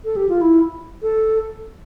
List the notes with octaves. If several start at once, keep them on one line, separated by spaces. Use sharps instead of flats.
A4
G4
F4
E4
A4